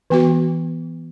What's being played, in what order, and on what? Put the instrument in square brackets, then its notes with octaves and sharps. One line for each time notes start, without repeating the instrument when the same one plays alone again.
[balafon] E3 B3 F#4